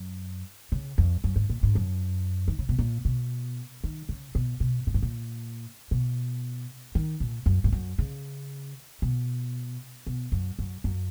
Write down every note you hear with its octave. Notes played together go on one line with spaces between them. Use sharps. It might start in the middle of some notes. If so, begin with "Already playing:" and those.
Already playing: F#2
C#3
F2
F#2
G#2
A#2
G#2
F#2
D#3
C#3
B2
A#2
B2
D#3
C#3
B2
B2
A#2
G#2
A#2
B2
D#3
A#2
F#2
G#2
F#2
C#3
B2
B2
F#2
F#2
F#2